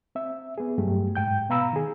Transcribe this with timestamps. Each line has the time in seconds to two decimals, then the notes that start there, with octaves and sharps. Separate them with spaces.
0.15 C4 E5
0.58 B3 G#4
0.78 G2 F#3 A3 G4
1.15 G#2 G5 G6
1.49 B2 B3 F5 A#5 B5 E6
1.73 D#3 G#4